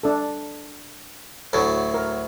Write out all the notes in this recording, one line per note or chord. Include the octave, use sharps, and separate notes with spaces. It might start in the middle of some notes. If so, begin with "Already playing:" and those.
D4 A4
D2 A2 F#3
A#4